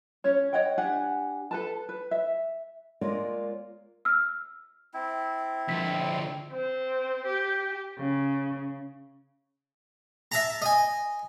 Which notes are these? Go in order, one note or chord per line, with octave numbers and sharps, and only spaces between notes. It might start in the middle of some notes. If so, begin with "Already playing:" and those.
C#4 C#5
C#5 D#5 F#5 G5
D4 G4 F#5 G#5
A4 B4 A5
B4
E5
G#3 A#3 F4 A#4 C#5 D5
E6 F6
C4 E4
D3 F3 B6
C4
G4
C#3
E5 A5 A#5
D#5 G#5